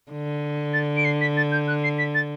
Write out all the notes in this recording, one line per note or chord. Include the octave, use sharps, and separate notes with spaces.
D3
A6
D7
C7
B6
A6
G6
F#6
C7
B6
A6